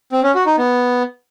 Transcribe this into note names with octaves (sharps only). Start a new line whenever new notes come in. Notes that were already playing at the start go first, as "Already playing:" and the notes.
C4
C#4
F#4
D#4
B3